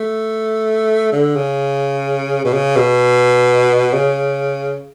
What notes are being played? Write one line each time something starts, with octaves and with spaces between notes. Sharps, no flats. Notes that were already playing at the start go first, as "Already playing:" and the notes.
Already playing: A3
D3
C#3
B2
C#3
B2
C#3